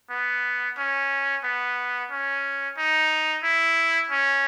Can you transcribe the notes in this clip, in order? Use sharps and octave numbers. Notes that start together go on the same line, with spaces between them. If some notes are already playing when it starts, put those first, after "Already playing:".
B3
C#4
B3
C#4
D#4
E4
C#4